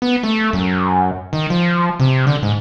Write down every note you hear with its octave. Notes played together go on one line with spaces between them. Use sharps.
B3
A3
F#2
D#3
F3
C3
D3
G#2